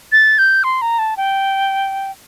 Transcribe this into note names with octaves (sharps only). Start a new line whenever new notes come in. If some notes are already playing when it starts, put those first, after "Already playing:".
A6
G6
C6
A#5
A5
G5